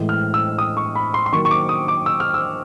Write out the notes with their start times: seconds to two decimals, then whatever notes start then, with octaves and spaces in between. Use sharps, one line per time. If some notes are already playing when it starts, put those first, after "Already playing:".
Already playing: A2 E3 G#3
0.09 F6
0.34 E6
0.58 D#6
0.77 C#6
0.95 B5
1.14 C6
1.26 C6
1.32 D#3 F#3 A#3 C#6
1.45 C#6
1.51 D6
1.69 D#6
1.88 D6
2.06 E6
2.20 F6
2.34 E6